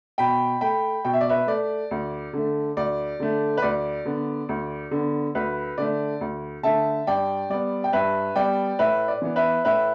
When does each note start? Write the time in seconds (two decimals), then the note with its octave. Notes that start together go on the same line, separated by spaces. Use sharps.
0.18 B2 G5 B5
0.61 A3 G5 B5
1.05 B2 G5
1.13 E5
1.21 D5
1.29 B4 E5
1.47 A3 D5
1.91 D2
2.33 D3 A3
2.77 D2 D5
3.20 D3 A3
3.57 B4
3.62 D2 D5
4.05 D3 B3
4.49 D2
4.91 D3 B3
5.35 D2 B4
5.78 D3 A3 D5
6.21 D2
6.63 D3 A3 E5 A5
7.07 G2 D5 G5
7.50 G3 B3 D5
7.84 G5
7.93 G2 B4 E5
8.36 G3 B3 D5 G5
8.79 A2 B4 E5
9.08 D5
9.22 E3 B3
9.36 B4 E5
9.65 A2 B4 E5